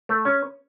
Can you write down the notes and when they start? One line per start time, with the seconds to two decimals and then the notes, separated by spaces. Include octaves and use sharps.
0.09 A3
0.25 C#4